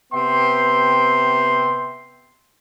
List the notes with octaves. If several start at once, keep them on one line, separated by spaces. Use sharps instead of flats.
C3 B3 E5 G5 C6